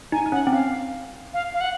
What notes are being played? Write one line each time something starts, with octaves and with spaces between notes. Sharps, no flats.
D#4 G#5
D#4
C#4 F#5
C4
C#4 F5
F5
F5
F#5